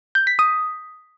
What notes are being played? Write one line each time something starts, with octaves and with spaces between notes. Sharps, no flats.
G6
B6
D#6